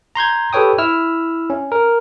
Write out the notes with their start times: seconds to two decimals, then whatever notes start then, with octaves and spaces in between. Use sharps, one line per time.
0.15 A#5 C6 G6 G#6
0.53 G4 A4 B4 C#5 G5 D#6
0.78 E4 E6 F6
1.50 C#4
1.72 A#4